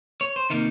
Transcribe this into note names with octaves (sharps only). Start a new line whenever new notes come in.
C#5
C5
C3 D#3 A#3 D#4 A#4